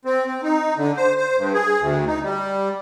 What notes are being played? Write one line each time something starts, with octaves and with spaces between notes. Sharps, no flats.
C4
C4
D#4
D3
C5
C5
G2
G#4
D2
D#4
G3